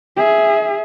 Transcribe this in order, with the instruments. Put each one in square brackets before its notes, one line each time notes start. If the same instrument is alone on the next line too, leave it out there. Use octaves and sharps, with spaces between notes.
[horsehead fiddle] G#4 E5